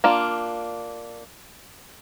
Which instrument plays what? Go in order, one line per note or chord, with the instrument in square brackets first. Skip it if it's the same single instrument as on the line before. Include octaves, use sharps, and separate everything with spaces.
[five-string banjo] A#3 D4 F4